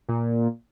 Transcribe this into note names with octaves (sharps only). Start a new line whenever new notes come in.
A#2